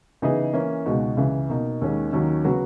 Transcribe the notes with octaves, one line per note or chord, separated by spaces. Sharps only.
C#3 E3 B3 D#4 G#4
E3 A#3 C#4
C#2 B2 G#3 D#4 F#4
C#2 C#3 E3
B2 A#3 D#4
D#2 D#3 G#3 C#4
D#2 D#3 F#3 C#4
C#3 F#3 B3 F#4